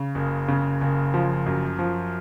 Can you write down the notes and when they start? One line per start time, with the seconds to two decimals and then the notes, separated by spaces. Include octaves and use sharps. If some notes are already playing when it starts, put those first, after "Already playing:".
Already playing: C#3
0.15 F#1
0.48 C#3
0.81 F#1
1.14 F3
1.46 F#2
1.79 F3